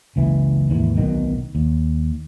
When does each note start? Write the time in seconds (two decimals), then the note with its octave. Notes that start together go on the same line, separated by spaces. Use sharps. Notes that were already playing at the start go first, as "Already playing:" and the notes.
0.16 F#1 C#2 E3
0.70 D#2 G#2 E3
0.96 D1 B1 B2 D#3
1.55 D#2